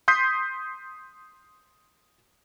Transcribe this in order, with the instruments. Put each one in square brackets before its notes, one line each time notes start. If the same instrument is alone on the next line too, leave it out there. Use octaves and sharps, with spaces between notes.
[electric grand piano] C6 D#6 G6 B6 C7